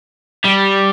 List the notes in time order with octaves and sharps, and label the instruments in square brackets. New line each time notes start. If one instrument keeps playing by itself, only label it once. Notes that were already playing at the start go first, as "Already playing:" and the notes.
[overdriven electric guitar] G3